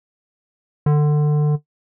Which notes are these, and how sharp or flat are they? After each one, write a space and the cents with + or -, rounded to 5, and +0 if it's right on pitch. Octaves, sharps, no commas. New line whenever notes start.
D3 +25